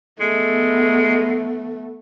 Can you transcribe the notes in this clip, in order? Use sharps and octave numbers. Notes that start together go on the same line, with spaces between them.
G#3 A3 B3